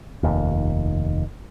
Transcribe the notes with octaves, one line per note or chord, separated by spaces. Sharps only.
F1 D#2